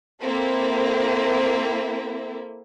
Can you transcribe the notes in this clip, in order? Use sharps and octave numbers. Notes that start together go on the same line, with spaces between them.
A#3 C4 E4 A4